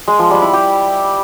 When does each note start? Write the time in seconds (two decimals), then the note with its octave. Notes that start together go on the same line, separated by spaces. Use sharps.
0.08 G#3
0.19 F3
0.30 G3
0.42 E4
0.53 G4